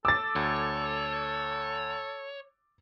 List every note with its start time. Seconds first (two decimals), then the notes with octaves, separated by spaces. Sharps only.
0.05 A4 D6 E6 A6
0.36 D2 C#5